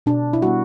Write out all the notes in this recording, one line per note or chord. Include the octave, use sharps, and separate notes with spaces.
B2 D4
E4
G3 B3 F#4